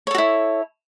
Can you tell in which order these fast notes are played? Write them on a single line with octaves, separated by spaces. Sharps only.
C#5 A4 F#4 E4